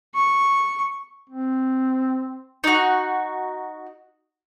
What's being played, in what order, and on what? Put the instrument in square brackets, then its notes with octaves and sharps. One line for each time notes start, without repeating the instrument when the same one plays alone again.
[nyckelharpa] C#6
[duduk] C4
[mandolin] D#4 F#4